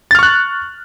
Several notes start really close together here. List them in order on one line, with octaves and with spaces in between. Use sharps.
A6 F6 C#6 F#6